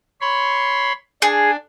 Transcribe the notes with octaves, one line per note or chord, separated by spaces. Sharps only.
C#5 B5 C6
D4 G#4